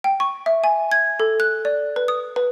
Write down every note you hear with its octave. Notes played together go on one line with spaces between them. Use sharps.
G5
C#6
E5
G#5
G#6
A4
F#6
D5
B4
D#6
B4